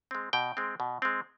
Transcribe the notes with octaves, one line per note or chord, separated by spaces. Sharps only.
G#3 C4
B2 G5
G#3 C4
B2
G#3 C4